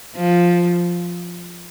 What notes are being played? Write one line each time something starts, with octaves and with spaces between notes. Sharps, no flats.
F3